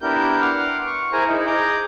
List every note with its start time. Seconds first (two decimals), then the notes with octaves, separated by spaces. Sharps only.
0.01 B3 D4 E4 G4 A#4 G6
0.41 F#5 C6 D6 F6
0.86 C#6
1.13 E4 G#4 A#4 C5 G#5 A#5
1.28 D#4 E4
1.47 G#4 A#5 D6 G6